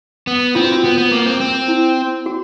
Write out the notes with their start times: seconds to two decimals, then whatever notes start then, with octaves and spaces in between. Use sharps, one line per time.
0.27 B3
0.55 C4 F4
0.64 F#4
0.72 F4
0.84 B3
0.98 B3
1.12 A#3
1.26 C4
1.41 C4
1.68 E4
2.26 F#4